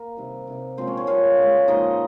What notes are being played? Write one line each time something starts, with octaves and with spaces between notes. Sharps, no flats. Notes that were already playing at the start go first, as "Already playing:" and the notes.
Already playing: A#3 A#4
C3 D#3 G3
C3 D#3 G3
A#2 F3 G#3 C4 C5
C#4 C#5
C#4 C#5
A#2 G3 F4 F5
C#3 G#3
A#2 F3 G#3 D#4 D#5